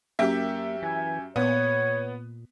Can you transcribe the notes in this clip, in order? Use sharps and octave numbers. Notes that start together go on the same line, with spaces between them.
F#2 A#3 G4 E5
E3 G#5
A#2 B3 C#5